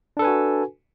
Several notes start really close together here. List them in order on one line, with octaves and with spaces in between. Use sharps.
D4 A4 B4 G#5 F#4